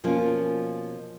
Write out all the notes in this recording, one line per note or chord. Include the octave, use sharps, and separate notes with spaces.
B2 F3 A#3 C#4 F4